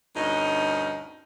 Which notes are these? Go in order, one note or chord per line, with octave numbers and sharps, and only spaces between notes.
D2 G2 B2 C#4 D#4